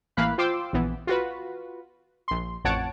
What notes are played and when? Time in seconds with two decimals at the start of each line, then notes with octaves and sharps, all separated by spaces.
0.17 A1 E3 A#3 F5 B5 F#6
0.38 F4 C5 G5 C6 D6 E6
0.73 A#1 E3 B3
1.07 F4 F#4 B4
2.28 A#1 C6
2.64 A1 F2 C#5 F#5 A5 D7